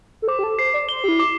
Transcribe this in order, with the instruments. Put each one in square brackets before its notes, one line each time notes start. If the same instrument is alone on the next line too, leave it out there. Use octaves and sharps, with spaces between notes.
[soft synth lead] A4
[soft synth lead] C5 [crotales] D6
[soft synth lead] G4
A4
[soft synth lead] C5 [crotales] C7
[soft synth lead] D5
[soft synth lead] C5 [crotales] G7
[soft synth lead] G4
E4
[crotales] D6